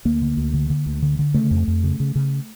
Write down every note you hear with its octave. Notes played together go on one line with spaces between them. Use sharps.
D2 A#3
D3
D2
D3
D3
D2
D3
D3
C#3 A3
F2
F2
C#3
C#3
C#3